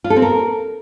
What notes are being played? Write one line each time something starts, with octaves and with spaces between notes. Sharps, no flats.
F4
A4
C4
A#4